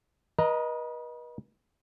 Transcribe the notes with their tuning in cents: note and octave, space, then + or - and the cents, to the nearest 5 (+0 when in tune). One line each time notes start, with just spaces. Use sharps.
B4 -40 D#5 +0 A#5 +0